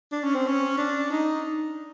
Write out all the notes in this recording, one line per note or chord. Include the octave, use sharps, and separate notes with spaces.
D4
C#4
C4
C#4
D4
D#4